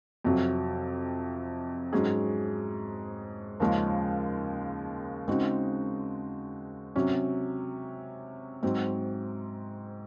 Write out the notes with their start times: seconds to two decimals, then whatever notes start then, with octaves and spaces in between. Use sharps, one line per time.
0.24 F2 C3 F#3
1.93 G#2 F#3 C#4 G#4
3.60 D#2 C#3 F3 G#3 C#4
5.28 C#3 G#3 C4 D#4 F#4
6.96 C3 F#3 C#4
8.63 G#2 F#3 C4